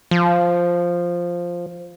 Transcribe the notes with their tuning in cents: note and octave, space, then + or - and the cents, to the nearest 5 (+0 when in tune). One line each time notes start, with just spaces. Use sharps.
F3 +0